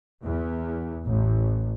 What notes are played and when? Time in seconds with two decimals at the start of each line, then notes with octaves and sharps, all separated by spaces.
0.23 E2
1.05 A1